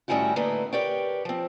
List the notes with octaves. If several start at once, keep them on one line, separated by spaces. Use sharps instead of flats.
A2 D#3 G3 C#4 E4 F#4
D3 A3 A#3 D#4 E4 B4
G4 A#4 B4 C#5 D5 G5
F3 C4